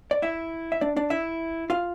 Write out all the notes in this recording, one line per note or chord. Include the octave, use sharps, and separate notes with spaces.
D5
E4 E5
E5
D4 D5
D4 D5
E4 E5
F4 F5